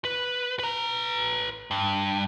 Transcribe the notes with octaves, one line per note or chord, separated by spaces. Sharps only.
B4
B4 A#5
G2